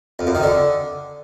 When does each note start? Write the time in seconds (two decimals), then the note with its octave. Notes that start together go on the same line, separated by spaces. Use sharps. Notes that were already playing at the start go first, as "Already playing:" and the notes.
0.19 F2
0.27 F#2
0.35 D#3
0.43 D3